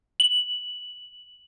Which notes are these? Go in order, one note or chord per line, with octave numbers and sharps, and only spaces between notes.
F#7